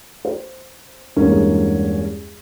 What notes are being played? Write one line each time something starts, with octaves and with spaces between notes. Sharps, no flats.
C5
E2 G2 G#3 A#3 C#4